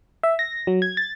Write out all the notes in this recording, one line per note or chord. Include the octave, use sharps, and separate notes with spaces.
E5
A#6
F#3
G#6
A6